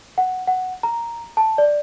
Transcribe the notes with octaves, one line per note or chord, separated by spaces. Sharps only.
F#5
F#5
A#5
A5
D5